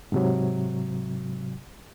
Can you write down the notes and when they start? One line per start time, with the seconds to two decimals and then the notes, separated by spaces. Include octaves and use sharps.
0.12 G#2 C3 F#3